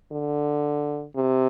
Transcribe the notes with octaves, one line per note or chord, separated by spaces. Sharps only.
D3
C3